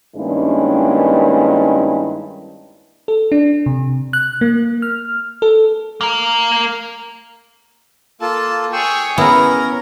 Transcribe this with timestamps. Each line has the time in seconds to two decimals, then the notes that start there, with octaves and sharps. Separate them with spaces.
0.16 G2 D#3 G#3 A#3 C#4 E4
3.08 A4
3.32 D4
3.66 C3
4.13 F#6
4.41 A#3
4.82 F6
5.42 A4
6.01 A#3 A#4
8.21 A#3 F4 A4 A5
8.73 G#4 C#5 G5 C#6 E6
9.18 B3 C#4 E4 A#4 A#5